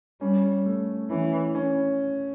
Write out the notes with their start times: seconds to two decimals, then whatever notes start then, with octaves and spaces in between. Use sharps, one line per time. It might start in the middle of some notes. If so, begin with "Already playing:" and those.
0.21 G3 C#4
0.66 A3
1.10 E3 C#4
1.55 C#4